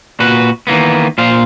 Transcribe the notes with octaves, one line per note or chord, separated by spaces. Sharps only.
A#2 F#4 B4
D#3 E3 A#3 B3
A#2 C5 F5